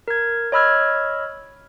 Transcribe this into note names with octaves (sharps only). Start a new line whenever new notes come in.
A#4 G#6
C#5 D#5 B5 E6 F6 G#6